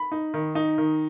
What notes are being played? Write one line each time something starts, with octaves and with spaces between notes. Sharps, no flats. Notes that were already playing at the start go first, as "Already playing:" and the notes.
Already playing: B5
D#4
D#3
D#4
D#3